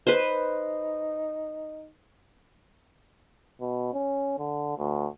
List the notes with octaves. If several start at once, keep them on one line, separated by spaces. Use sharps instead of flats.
D#4 B4 C5
B2
C#4
D3
D2